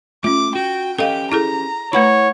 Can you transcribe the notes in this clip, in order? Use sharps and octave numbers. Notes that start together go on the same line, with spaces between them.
A3 C#4 F4 D6
F#4 G5
C#4 G4 A4 B4 D#5 F5 G5
E4 G#4 A4 A#5
A3 E4 B4 C#5 F#5 B5